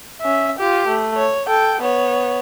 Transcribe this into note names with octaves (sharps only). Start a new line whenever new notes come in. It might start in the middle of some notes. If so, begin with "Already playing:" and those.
C#4 E5
F4 G4
A3
C#5
A4 G5
B3 C#5